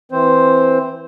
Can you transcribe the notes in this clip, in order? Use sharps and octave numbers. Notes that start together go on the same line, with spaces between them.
E3 C4 C5